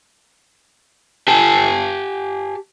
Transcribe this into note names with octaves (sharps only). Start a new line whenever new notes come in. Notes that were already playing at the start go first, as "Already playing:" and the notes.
G4 G#5 A5